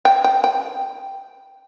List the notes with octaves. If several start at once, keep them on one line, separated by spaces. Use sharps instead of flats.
G5
G5
G5